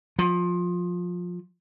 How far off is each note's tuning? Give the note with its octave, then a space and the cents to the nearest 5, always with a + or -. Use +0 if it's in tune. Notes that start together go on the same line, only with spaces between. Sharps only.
F3 +20